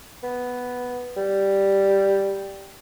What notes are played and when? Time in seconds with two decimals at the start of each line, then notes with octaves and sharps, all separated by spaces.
0.23 B3
1.17 G3